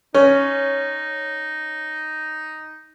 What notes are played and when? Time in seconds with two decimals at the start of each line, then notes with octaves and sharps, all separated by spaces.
0.14 C#4 D#4